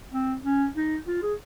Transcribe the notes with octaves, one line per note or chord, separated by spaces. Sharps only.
C4
C#4
D#4
F4
G#4